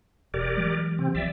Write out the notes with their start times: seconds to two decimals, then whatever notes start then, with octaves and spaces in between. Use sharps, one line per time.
0.34 E1 G4 A#4 D5
0.57 E3 F#3 G#3
0.99 C3 C4
1.15 C2 F3 D5 E5